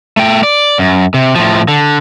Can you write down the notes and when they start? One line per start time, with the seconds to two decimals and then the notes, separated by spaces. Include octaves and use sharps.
0.17 A3 G5
0.43 D5
0.79 F#2
1.14 C3
1.35 A2 F3
1.68 D3